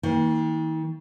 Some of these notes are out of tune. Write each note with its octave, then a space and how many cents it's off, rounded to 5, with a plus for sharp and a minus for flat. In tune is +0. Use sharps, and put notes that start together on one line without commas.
D#3 +45 A#3 +0